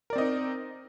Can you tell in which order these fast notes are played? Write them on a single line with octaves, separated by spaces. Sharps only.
A#4 D5 C4 D#5 D#4